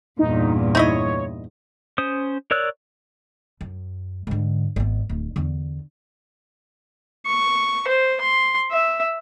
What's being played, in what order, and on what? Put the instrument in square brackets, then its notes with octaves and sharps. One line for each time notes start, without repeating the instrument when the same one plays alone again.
[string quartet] E2 G2 A#2 [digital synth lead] D#4
[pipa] D#4 E4 D#5 [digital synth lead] C#5
[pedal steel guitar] C#4 C5 D#6
A#4 C#5 D5 E6 F#6
[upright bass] F#2
G#2 D3
G#1 B3
D1
E2 D3
[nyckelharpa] C#6
C5
C6
E5